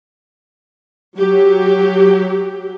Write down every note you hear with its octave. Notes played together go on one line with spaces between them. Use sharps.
F#3 G4